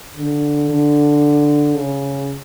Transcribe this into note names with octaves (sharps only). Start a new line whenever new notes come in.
D3
D3
C#3